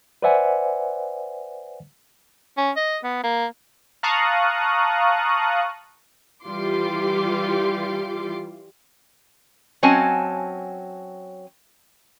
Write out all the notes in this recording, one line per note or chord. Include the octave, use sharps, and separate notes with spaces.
B4 C5 D5 E5 F#5 G#5
C#4
D#5
B3
A#3
F5 A5 A#5 C#6 D#6 F#6
E3 G3 F4 C6 D6
F#3 C4 C#4 D#5 G#5 A5